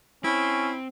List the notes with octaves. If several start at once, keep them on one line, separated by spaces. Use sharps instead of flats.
C4 C#4 E4